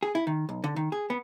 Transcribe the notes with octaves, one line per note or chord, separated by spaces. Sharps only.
G#4
E4
D#3
B1
D3
D#3
G#4
B3